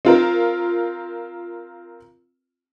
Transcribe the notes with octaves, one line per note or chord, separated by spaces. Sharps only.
C4 F4 A#4